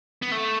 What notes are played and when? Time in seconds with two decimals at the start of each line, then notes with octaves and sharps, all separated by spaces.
0.22 B3
0.32 A3